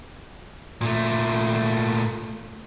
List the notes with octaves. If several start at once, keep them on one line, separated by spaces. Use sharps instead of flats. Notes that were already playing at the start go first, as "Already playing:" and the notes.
A#2 A3